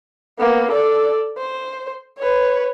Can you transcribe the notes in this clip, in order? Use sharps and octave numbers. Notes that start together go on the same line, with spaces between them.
A#3 B3
A4 D5
C5
B4 C#5